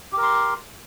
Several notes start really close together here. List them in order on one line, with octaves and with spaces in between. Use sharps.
G4 A#4 C6